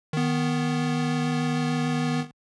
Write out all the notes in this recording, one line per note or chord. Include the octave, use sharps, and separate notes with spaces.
D#3 B3